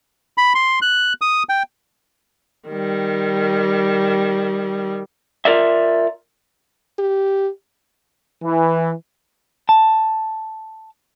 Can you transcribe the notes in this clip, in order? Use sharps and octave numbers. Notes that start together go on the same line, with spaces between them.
B5
C6
F#6
D#6
G5
D#3 G3
F4 A#4 D5 E5
G4
E3
A5